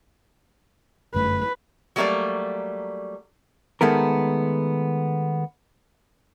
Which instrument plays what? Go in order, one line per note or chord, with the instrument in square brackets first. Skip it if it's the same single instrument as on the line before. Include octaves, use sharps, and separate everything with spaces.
[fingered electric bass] G1 F#2 A3 [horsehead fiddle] B4
[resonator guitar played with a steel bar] F#3 G3 A3 A#3 A4 D5
[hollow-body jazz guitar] D#3 G#3 A3 B3 A#4